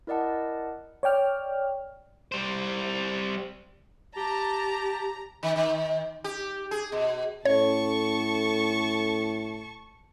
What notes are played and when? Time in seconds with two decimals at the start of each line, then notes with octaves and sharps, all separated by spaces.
0.07 E4 A#4 D5 D#5 F#5 A5
1.03 C#5 D5 G5 F6
2.32 G3 C5
4.17 G4 A5 A#5
5.43 D#3
5.56 D#3
6.24 G4
6.71 G#4
6.92 B2
7.45 A2 C#4 A4 C#5 A5 C#6